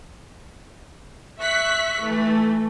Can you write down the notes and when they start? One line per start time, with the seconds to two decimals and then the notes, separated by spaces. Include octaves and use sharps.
1.39 E5 C#6 F#6 B6
2.04 E3 A3